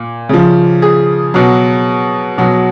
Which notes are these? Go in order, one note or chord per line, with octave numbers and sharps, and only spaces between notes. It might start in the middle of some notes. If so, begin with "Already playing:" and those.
Already playing: A#2
C#3 F3
G#4
B2 F#3
B2 F#3